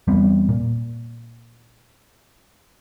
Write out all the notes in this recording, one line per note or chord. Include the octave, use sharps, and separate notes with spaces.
E2 G3 B3 C4
A#2